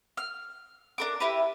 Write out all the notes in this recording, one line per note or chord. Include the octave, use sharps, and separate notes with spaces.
F6
D4 A#4 D6
E4 G4 A#4 B4